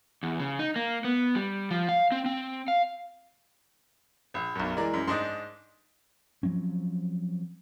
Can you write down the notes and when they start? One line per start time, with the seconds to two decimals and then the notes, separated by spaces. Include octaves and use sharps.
0.23 E2
0.40 C#3
0.59 D#4
0.76 A#3
1.04 B3
1.35 G3
1.71 F3
1.89 F5
2.12 C4
2.26 C4
2.68 F5
4.34 A#1
4.56 B1 F#2
4.77 E3 G#3 A#4 D5
4.93 F#2
5.08 G#2 D4 D#4 C6
6.43 F3 F#3 C4 C#4